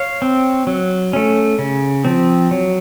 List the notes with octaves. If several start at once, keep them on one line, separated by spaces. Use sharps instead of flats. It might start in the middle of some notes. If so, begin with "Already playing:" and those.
Already playing: C#5 F5
C4
F#3
A3 C#4
C#3
F3 C4
F#3